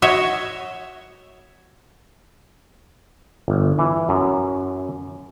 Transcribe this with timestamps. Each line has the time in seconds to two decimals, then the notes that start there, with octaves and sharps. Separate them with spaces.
0.02 F#4 C#5 D#5 E5
3.48 G1
3.79 E3
4.09 F#2